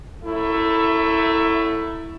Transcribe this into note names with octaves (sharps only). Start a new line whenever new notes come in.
F#2 A3 E4